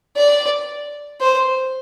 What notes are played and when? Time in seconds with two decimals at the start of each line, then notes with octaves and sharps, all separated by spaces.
0.16 D5
1.21 C5